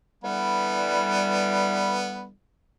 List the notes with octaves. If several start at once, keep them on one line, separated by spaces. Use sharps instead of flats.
D3 E3 G3 B3